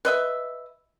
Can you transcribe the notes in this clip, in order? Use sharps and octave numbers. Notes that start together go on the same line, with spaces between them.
B4 D#5 E5